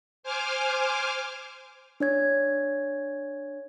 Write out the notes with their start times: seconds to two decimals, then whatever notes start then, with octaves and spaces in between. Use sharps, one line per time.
0.23 C5 G#5 D6 F6
2.00 D4 C#5 G#6